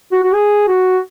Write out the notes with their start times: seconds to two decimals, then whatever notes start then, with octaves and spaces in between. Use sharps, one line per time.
0.12 F#4
0.23 F#4
0.34 G#4
0.68 F#4